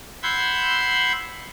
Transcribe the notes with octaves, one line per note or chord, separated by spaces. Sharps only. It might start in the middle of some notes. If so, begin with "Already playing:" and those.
F#5 B5 C6 E6 G6 G#6